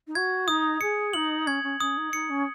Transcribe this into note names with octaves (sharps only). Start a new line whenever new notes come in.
D#4
F#4 G#6
D#4 D#6
G#4 C#7
D#4 F#7
C#4 G#6
C#4
C#4 D#6
D#4
D#4 C#7
C#4